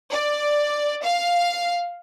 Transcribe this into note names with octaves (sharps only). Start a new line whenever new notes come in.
D5
F5